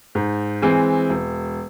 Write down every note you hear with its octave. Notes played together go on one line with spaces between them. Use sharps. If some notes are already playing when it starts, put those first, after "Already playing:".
G#2
E3 G#3 C4
E1